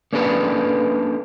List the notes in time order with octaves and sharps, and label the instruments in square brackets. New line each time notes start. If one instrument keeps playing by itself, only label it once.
[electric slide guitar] A#3 C#4 D4 A4 B4